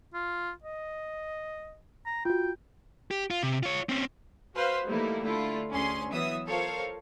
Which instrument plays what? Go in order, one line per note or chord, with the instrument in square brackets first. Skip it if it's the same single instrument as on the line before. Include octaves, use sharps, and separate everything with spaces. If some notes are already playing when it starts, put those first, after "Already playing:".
[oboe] F4
D#5
A#5
[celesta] F4 F#4 [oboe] G5
[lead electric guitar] G4
F4
C3
F4 C#5
C4 C#4
[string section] F#4 B4 C5 F5 C6
E3 G3 A3 A#3 D#4 E4
D3 A3 E4 F4
D2 C#4 G#4 C6
E3 F#3 B3 E5 D#6 E6
F4 A4 A#4 C5 C#5 F5